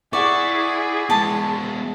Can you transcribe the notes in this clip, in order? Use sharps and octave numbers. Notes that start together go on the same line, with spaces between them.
E4 G#4 D5 F#5 C#6
G#3 B3 A5